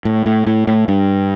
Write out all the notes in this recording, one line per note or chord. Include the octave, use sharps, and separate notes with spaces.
A2
A2
A2
A2
G2